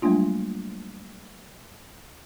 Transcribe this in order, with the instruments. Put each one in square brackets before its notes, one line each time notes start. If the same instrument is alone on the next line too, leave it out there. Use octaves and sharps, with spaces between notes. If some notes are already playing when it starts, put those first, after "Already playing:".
[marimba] F#3 G3 A3 A#3 D4 F4